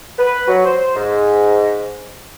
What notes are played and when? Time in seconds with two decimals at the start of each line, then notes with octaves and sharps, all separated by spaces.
0.18 B4
0.47 F#3
0.65 C5
0.95 G#2